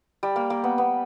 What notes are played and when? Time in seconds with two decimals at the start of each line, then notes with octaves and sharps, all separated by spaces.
0.23 G3
0.36 A#3
0.50 A#3
0.64 B3
0.78 B3